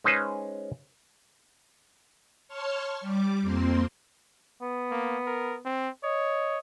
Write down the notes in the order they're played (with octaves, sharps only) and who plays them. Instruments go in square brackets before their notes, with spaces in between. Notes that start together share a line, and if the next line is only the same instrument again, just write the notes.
[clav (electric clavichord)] G#3 C#4 D#4 B4 C5
[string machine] C#5 A5 C6 C#6 F6
G3 D6
F2 A#3 C4 C6
[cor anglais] B3
[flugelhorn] A#3
A#4
C4
[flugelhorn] C#5 [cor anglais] D#5